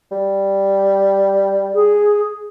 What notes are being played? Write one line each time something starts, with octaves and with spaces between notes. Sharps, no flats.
G3
G#4